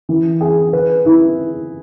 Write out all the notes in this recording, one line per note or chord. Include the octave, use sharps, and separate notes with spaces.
E3
G#4
B4
E4